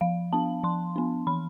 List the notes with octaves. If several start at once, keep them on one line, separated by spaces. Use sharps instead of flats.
F3 F5
B3 D4 A5
F3 C6
B3 D4
E3 B5